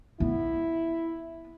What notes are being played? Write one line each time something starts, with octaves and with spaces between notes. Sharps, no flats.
B3 E4